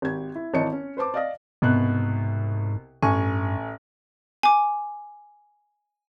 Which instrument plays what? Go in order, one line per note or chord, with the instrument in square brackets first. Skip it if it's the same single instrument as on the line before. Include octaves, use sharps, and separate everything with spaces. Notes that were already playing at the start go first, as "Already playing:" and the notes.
[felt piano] G#1 G4 G#6
E4
G#1 E3 C#5 D#5 A5 C#7
C#4
B4 C5 A5 D6
D5 D#5 F5 D#6 A#6
[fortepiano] C2 B2 F#6 [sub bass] G#2
[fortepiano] A1 G#5 C#6 [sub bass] G2
[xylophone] G#5 D6